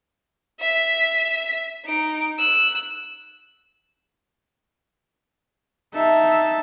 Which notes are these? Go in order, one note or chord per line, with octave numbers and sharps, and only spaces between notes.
E5 B6
D#4 D7
E6 F#6
D#4 E5 A5